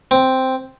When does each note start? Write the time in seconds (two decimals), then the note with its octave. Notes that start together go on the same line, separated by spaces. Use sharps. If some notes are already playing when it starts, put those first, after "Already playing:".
0.11 C4